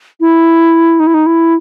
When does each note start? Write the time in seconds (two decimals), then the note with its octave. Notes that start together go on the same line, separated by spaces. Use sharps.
0.20 E4
1.00 D#4
1.07 E4
1.14 D#4
1.26 E4